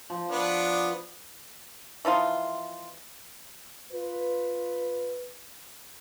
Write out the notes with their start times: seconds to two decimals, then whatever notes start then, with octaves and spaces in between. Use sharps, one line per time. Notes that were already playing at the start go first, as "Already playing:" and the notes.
0.10 F3
0.30 B3 D4
2.05 E3 F3 D#4 F4
3.92 F4 B4